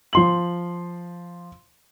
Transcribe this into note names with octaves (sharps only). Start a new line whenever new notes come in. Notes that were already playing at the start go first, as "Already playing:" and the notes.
F3 C6 F#7